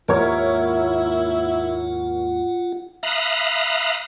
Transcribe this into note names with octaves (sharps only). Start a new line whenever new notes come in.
D#2 G#2 A#3 E4 F4 A#4 C#5 F#5
E5 F5 A#5 B5 D#6 F#6